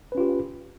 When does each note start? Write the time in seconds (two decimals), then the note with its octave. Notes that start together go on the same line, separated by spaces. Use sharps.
0.12 B4
0.15 C#4
0.17 F4
0.20 G4